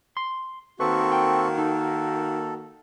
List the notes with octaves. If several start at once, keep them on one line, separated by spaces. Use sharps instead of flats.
C6
D#3 A#3 C4 F#4 A4 B4 C#6
G5
D#4 A4